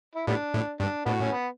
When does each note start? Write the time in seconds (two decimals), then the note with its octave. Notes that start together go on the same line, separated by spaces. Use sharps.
0.16 E4
0.27 A2 G3 B3 D4
0.54 A2
0.80 G2 D4
1.06 A2 B3 D4 F#4
1.20 C#4
1.31 B3